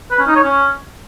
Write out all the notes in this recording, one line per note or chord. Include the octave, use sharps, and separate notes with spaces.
B4
C#4
D#4
C#5
C#4